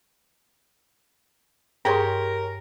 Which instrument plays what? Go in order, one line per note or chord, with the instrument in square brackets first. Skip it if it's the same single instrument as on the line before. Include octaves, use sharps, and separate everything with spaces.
[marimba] G2 C6 [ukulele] G4 G#4 C#5 [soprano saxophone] A#4